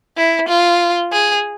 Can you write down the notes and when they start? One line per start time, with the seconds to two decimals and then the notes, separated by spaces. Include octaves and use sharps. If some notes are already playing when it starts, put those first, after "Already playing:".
0.17 E4
0.48 F4
1.12 G#4